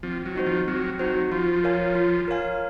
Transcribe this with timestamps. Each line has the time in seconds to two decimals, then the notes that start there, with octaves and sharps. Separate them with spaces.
0.03 F3 C4
0.26 F#3
0.36 D#4 F#4 C5
0.46 F3
0.68 F#3 C4
0.99 F#3 D#4 F#4 C5
1.31 F3 F4
1.64 A#4 C#5 F5 G#5
1.95 F4
2.28 A#4 C#5 F5 G#5